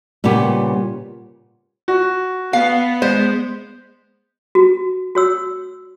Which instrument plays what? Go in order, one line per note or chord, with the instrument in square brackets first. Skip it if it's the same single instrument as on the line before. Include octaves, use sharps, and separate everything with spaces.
[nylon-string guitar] A#2 C#3 G3 B3 G4
[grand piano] F#4
[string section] B3 [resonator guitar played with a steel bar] F5
[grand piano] G#3 [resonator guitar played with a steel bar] C5
[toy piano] F#4
F#4 C#5 E6